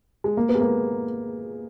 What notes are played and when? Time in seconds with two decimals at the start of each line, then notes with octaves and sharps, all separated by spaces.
0.24 G#3
0.37 A#3
0.49 B3
0.55 G#3
0.61 A#3